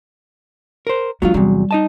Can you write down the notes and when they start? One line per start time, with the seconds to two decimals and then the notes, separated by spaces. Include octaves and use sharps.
0.87 A#4 C5
1.22 F#3 G#3 D4 F4
1.34 E2 C3 F#3 G3
1.71 D#4 D#5 A5